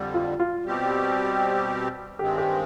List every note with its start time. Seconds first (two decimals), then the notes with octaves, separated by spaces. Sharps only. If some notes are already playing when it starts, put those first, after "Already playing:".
Already playing: F2 D3 G3
0.14 F4
0.40 F4
0.65 B2 G3 C4 G4
2.18 G2 D#3 G#3 C4 G4
2.38 G4